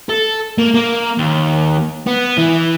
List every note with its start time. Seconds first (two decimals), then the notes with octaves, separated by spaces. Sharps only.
0.09 A4
0.58 A#3
0.74 A#3
1.18 D#2
2.07 B3
2.38 E3